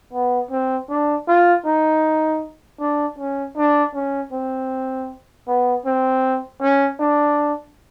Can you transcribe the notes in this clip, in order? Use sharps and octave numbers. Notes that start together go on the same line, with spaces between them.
B3
C4
D4
F4
D#4
D4
C#4
D4
C#4
C4
B3
C4
C#4
D4